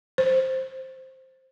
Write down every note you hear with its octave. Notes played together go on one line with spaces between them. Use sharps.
C5